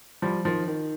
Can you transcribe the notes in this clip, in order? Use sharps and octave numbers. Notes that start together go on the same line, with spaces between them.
F3 G3
D#3 F3
D#3